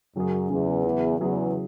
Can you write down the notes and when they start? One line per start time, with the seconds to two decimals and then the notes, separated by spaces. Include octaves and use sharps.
0.16 F#2 C#3 F#3 C#4 G#4
0.50 E2 C#3 F#3 C#4 G#4
0.84 C#3 F#3 E4 G#4
1.19 E2 C#3 F#3 E4 G#4